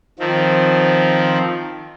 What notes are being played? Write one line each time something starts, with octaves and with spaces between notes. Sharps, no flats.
D#3 F3 C4